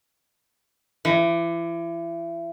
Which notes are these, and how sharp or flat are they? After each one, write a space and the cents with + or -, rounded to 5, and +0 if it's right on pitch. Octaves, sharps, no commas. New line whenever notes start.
E3 +35